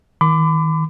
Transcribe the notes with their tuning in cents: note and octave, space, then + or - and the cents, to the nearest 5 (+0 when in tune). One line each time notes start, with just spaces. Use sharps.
D#3 +30 B5 +40 D6 +0